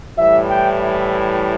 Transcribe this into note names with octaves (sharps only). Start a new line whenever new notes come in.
A2 E3 G3 E5
G5
E5